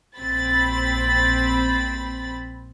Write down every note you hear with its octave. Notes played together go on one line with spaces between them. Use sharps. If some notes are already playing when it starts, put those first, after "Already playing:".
A#1 C4 B5 A6